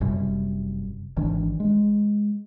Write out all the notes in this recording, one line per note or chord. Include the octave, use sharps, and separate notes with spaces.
F#1 F#2 C3 G3
G#1 D#3 E3 D4
G#3